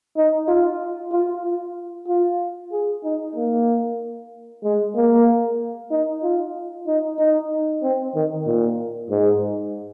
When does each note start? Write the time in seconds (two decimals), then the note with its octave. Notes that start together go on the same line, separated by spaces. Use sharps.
0.16 D#4
0.48 F4
1.11 F4
1.44 F4
2.08 F4
2.72 G#4
3.04 D#4
3.35 A#3
4.64 G#3
4.95 A#3
5.91 D#4
6.23 F4
6.87 D#4
7.19 D#4
7.83 C4
8.15 D#3
8.46 A#2
9.10 G#2